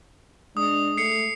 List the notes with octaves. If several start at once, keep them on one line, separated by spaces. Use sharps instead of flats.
G#3 D4 D#6
A3 C7 C#7